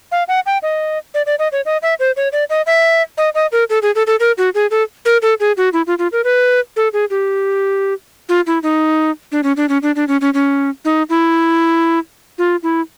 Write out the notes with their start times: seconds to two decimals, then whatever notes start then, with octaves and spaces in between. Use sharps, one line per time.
0.12 F5
0.28 F#5
0.46 G5
0.63 D#5
1.14 D5
1.26 D5
1.39 D#5
1.52 C#5
1.65 D#5
1.83 E5
2.00 C5
2.17 C#5
2.32 D5
2.50 D#5
2.66 E5
3.18 D#5
3.35 D#5
3.52 A#4
3.70 A4
3.82 G#4
3.95 A4
4.07 A4
4.20 A#4
4.38 F#4
4.55 G#4
4.71 A4
5.05 A#4
5.22 A4
5.40 G#4
5.57 F#4
5.73 E4
5.87 F4
5.99 F4
6.12 A#4
6.24 B4
6.76 A4
6.93 G#4
7.10 G4
8.29 F4
8.47 E4
8.63 D#4
9.32 D4
9.43 C#4
9.57 D4
9.69 C#4
9.83 D4
9.96 D4
10.08 C#4
10.21 C#4
10.34 C#4
10.85 D#4
11.09 E4
12.38 F4
12.63 E4